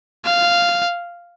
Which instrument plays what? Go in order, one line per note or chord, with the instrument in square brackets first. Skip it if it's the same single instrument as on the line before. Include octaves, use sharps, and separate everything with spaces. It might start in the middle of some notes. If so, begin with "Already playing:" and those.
[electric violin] F5